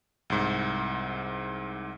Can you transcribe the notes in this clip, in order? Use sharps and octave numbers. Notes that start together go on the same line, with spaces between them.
C2 G#2